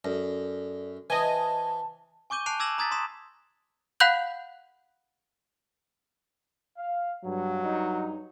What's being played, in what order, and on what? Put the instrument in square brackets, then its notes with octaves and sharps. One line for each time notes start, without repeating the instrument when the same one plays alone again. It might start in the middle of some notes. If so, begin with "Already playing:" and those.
[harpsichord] F#2 [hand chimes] A4 D5 A#6
[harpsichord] E3 [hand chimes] C5 [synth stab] D#5 G#5 [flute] A5
[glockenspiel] G#5 C#6 D6 G6 D#7 G7
A5 F#6 C7 D7 D#7 F7
D6 E6 G#6 A#6 E7 F#7
A#5 D#6 G#6 A6 B6
C6 D#6 B6 E7
[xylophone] F5 F#5 B5 F#6 G6 F#7
[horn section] F5
[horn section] G2 [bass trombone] F#3
[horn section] G2 D#4